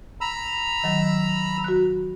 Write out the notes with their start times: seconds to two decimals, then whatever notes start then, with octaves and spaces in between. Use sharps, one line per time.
0.21 A#5 B5 E6
0.84 D#3 F#3
1.64 F#4 F#6